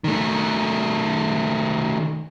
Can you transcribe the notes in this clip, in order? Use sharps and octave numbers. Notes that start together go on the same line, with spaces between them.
D#3 A3